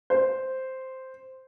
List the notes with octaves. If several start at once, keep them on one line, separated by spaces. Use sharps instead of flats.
C5